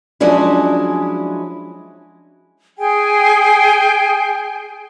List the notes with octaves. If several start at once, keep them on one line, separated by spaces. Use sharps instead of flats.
F3 F#3 G#3 C#4 D4 E4
G#4 G5 G#5